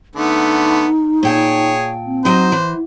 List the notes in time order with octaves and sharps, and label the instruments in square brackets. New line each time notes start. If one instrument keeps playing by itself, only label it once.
[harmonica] D3 A3 B3 [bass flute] D#4
[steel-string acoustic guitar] A#2 G5 A5 [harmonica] G#4 C#5
[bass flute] C4
[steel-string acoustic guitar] F#3 D#4 [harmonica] C5
[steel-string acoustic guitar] E3